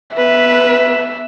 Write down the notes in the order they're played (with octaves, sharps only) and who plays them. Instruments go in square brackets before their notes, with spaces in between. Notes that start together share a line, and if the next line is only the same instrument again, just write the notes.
[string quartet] B3 B4 [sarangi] E5